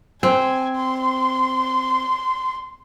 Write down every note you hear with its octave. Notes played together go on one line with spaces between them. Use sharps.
C4 G#5
C6